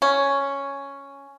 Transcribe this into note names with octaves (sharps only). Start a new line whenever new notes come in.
C#4